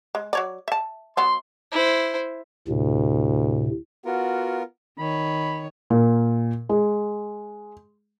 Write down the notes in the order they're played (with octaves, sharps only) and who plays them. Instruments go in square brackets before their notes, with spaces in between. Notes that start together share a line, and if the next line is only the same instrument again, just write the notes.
[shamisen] G#3
F#3 C#5 D5
E5 A5
[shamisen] F#3 B3 E4 [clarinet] C6
[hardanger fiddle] E4 C5
[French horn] D2 [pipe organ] A2 C3
[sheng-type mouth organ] B3 F4 A#4 [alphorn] F#4
[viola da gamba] D#3 C#5 [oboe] B5
[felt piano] A#2
G#3